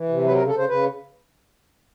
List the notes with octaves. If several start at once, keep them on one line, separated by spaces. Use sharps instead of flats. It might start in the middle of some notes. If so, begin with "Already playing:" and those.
Already playing: E3
C3
F#3 B4
A#4
C#3
A4
C#3 C5
C#3 B4